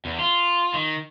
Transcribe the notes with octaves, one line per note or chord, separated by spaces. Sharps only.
E2
F4
D#3